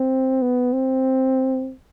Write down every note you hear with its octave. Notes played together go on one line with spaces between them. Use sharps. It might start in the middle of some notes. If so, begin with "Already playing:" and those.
Already playing: C4
B3
C4